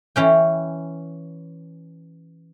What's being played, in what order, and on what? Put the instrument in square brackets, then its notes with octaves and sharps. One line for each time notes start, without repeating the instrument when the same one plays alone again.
[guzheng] E3 C#4 G5